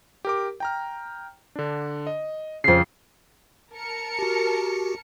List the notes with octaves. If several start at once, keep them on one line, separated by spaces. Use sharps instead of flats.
G4 A#4 D6
G5 A#5 F6
D3 D4
D#5
F2 C#3 C7
A#4 A5 C#7
F#4 G4